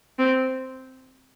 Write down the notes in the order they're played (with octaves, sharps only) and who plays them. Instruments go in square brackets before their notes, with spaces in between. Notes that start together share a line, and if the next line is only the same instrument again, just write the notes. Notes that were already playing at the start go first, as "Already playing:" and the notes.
[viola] C4